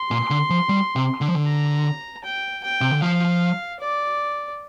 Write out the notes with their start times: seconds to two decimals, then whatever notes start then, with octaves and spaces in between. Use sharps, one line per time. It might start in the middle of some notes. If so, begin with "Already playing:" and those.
Already playing: C6
0.11 A#2
0.30 D3
0.50 F3
0.69 G3
0.96 C3
1.21 D3
1.28 F3
1.36 D3
1.46 A#5
2.24 G5
2.63 G5
2.81 C3
2.91 D3
3.02 F3 F5
3.80 D5